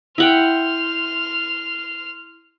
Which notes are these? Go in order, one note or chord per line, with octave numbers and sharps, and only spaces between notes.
E4 F#5 G5 C6 F6